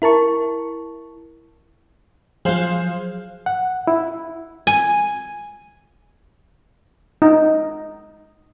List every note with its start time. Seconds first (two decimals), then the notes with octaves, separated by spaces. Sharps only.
0.02 E4 A#4 A5 C#6
2.45 F3 F#3 G#4 C5 F5
3.46 F#5
3.87 E4
4.67 G#5
7.22 D#4